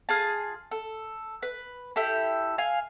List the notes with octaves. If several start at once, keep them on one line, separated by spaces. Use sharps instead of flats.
F4 G#4 A5
A4
B4
E4 G4 A4
F5 G#5